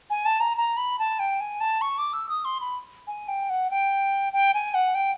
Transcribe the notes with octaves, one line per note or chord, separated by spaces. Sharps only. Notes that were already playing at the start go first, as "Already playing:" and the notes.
G#5
A5
A#5
A#5
B5
A5
G5
G#5
A5
C#6
D6
E6
D#6
C6
B5
G#5
G5
F#5
G5
G5
G#5
F#5
G5